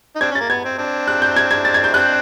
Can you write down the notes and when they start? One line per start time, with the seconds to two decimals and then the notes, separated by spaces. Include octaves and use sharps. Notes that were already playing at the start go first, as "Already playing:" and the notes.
0.16 D#4
0.21 C4 D4 G#6
0.31 C#4 A6
0.41 A#3
0.49 B3 G#6
0.65 C4
0.78 C4 D4
1.08 F#6
1.22 G6
1.36 G#6
1.51 G#6
1.65 A6
1.74 G#6
1.84 G6
1.93 C4 D4 F#6